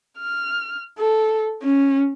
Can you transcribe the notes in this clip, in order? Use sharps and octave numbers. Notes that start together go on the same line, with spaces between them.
F6
A4
C#4